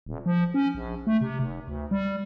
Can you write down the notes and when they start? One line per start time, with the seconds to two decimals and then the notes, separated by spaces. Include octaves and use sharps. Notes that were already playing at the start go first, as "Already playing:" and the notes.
0.06 D#1
0.26 F3
0.54 C#4
0.75 A#1
1.07 A3
1.21 C3
1.39 F1
1.67 D2
1.91 G3